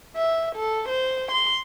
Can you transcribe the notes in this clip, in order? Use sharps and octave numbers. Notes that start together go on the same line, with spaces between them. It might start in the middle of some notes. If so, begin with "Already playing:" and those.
E5
A4
C5
C6